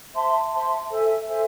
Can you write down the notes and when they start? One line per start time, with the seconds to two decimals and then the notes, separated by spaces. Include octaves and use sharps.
0.14 C5 E5 A5 C6
0.52 C5 E5 A5 C6
0.90 A4 C5 E5 G#5
1.28 A4 C5 E5 G#5